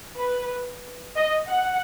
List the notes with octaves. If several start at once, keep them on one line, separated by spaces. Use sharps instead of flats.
B4
D#5
F#5